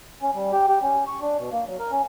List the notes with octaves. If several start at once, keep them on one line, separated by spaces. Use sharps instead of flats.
C#4
G3
G4
G4
C#4
C#6
D4
B2
A#3
F#3
A#4
C#4